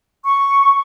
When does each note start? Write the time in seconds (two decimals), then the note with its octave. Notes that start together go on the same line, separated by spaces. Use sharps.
0.25 C#6